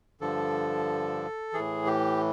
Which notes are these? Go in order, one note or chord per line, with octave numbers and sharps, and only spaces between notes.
G2 D3 F3 A4
A2 E3 G#4
G4